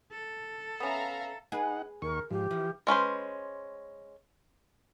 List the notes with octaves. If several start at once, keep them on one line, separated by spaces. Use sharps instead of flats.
A4
B3 C#4 E5 F5 A#5
D#4 G#4 B4 F#5
D#2 A#4 C#6
G#2 F3 G4
E3 F3
G#3 C#4 B4 C5